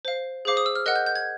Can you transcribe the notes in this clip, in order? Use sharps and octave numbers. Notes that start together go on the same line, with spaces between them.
C5 F5
G#4 C5 F5 D6
D#6
E6
F6
A#4 D#5 F#5 F#6
G6
G6
G#6